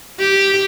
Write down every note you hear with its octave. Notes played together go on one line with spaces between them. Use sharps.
G4